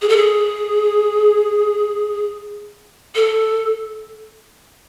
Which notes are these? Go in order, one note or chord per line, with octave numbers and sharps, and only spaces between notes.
G#4
A4
G#4
A4